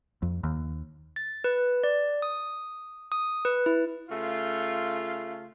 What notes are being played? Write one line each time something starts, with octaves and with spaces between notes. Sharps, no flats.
F2
D#2
A6
B4
D5
D#6
D#6
B4
E4
C#3 A3 F4